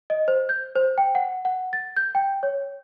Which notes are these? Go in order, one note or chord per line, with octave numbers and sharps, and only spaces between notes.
D#5
C5
G6
C5
G5
F#5
F#5
A6
G6
G5
C#5